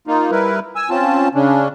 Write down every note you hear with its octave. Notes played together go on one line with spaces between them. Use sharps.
A#3 D#4 F4
G3 E4 A#4 B4
G#5 E6
C4 C#4 F4 A5
C#3 C#4 D4